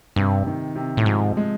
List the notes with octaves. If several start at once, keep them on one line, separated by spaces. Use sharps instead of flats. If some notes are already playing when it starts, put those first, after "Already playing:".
G2 C3
D#3
C3
A2
G#2 F3
G#3